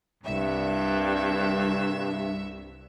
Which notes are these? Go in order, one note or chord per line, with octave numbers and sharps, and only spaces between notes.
C2 G2 E5